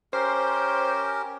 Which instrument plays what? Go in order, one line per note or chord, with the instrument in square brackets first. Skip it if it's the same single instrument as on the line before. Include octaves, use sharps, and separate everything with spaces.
[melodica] C#4 G4 A#4 [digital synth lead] C5